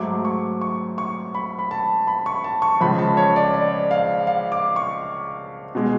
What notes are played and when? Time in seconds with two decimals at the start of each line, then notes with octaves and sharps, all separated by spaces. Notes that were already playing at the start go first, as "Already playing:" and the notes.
Already playing: G#2 F#3 A3 D6
0.25 C#6
0.61 C#6
0.98 C#6
1.35 B5
1.59 B5
1.71 A5
2.07 B5
2.26 C#6
2.44 A5
2.62 C#6
2.81 C#2 C#3 F3 B5
2.99 A5
3.17 C#5
3.36 D5
3.54 D5
3.91 F5
4.27 F5
4.52 D6
4.76 C#6
5.75 B2 G#3